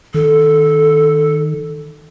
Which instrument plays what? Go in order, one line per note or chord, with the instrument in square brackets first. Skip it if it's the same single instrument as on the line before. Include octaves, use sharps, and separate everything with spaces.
[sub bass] D#3 [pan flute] A4